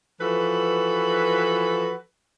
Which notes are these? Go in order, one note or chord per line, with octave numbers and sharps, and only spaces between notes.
E3 F3 F#4 A4 B4